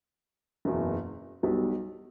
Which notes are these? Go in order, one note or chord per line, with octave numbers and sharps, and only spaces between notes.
F#1 E2 B2
B1 B2 G3